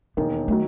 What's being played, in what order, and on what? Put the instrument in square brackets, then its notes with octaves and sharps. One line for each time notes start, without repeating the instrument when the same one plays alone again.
[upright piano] E1 D#2 D#3 [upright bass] B3
[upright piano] D#3 F#3 [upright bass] A3